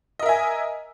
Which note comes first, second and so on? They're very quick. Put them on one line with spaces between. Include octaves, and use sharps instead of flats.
D#5 A#4 E5 G#5